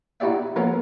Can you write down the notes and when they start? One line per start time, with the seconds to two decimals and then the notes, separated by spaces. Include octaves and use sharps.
0.20 D#4 E4 F#4 G4 D5 E5
0.56 F3 A#3 B3 C#4 A4 A#4